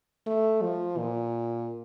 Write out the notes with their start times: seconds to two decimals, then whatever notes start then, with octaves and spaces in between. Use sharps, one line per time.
0.27 A3
0.62 F3
0.98 A#2